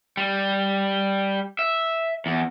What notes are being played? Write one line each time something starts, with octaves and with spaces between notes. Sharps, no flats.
G3
E5
E2